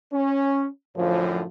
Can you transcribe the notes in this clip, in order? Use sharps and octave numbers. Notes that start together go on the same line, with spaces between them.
C#4
F#2 A2 D3 F3